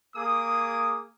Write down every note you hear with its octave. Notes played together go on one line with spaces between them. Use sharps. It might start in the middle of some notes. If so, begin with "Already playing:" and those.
A#3 G#4 D6 D#6